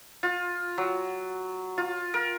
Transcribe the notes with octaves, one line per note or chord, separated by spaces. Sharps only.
F4
F#3
F4
A#4